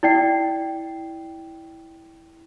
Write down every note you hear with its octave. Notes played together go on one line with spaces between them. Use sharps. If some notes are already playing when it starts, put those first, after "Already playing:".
E4 D5 G5 C7